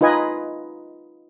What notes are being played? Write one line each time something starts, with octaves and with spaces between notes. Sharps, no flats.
D#4 F4 B4 D#5 G#5